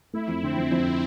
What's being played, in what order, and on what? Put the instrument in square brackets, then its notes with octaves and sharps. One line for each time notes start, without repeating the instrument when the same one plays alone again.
[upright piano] A3 [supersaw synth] E4
[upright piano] F2
[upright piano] D3 [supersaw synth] C4
[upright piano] F2
F2